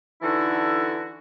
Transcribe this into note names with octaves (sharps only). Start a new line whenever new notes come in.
D3 E3 D#4 E4 F#4 A4